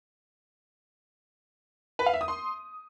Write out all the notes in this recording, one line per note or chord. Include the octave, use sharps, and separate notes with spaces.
B4
F5
E5
D#6
C6